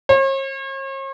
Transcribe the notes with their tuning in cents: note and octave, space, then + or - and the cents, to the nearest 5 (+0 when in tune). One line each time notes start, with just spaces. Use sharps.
C#5 -45